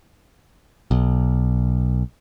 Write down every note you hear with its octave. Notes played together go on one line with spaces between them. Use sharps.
B1